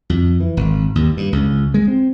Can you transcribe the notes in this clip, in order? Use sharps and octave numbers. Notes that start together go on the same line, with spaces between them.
F2
E3
G#1
D#2
G2
C#2
G#3
C4